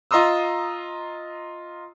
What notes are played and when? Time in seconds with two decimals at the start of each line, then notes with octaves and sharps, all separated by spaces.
0.11 F4 D#5 A#5 C6 D#6 E6